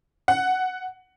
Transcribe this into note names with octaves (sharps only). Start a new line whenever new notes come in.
F#5